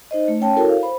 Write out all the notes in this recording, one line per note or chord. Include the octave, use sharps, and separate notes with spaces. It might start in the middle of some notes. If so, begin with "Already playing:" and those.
D#4 C5 D#5
A3
C#4 C#5 G5 A5
E4 F#4 A4 A#4 C#5
F5
C5 B5